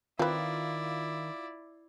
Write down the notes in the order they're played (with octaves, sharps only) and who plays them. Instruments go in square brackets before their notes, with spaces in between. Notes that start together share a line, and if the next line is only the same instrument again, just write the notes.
[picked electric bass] D#3 [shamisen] C4 B4 [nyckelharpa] E4 D5 [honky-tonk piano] F4